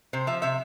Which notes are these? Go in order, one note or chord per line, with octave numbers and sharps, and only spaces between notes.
C3 C5
F3 E5
C3 E5